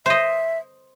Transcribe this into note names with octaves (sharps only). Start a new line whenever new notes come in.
C5 D#5 E5